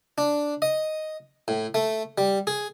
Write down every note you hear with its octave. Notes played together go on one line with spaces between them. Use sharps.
D4
D#5
A2
A3
G3
G#4